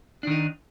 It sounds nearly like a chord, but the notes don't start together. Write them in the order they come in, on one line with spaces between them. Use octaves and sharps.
D4 D#3 D#4